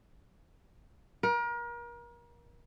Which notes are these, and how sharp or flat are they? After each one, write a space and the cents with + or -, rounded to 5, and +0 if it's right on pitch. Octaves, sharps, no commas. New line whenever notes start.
A#4 +35